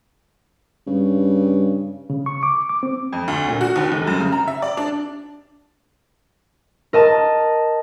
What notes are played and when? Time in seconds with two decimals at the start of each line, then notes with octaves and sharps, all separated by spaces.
0.87 G2 C#3
2.10 C#3
2.26 C#6
2.43 D6
2.69 D6
2.83 C4
3.13 F2
3.28 D2
3.48 A#2
3.61 F#4
3.76 D#2
3.92 F1
4.07 F#2
4.20 C#3
4.32 A#5
4.48 E5
4.62 D5
4.77 D4
6.93 A#4 D#5 A5